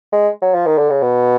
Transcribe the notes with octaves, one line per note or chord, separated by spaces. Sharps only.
G#3
F#3
F3
D#3
D3
C#3
B2